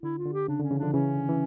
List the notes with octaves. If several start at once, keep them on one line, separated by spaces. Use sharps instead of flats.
D3 E4
F4
D3
G4
C#3 D4
D3
C#4
C#3 E3
D3 F3 D4
C#3 E3 C#4
D3
E3